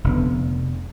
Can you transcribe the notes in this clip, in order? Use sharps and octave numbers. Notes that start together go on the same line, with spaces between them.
F1 D3 B3